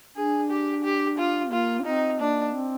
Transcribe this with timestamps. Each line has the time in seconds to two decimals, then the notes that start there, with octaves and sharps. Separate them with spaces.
0.15 D4 G#4
0.50 G4
0.84 G4
1.18 F4
1.51 A#3 F4
1.80 D4
1.85 C4 D#4
2.20 A#3 D4
2.54 C4